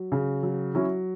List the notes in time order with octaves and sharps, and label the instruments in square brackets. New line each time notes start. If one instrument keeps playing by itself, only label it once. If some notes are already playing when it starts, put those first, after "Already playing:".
Already playing: [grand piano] F#3
C#3
F#3
F#3 C#4 E4